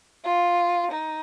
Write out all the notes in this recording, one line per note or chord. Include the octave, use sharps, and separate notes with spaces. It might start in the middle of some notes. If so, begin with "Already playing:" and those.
F4
D#4